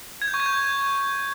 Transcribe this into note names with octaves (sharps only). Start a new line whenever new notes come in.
G#6
G6
C#6
G#6
G6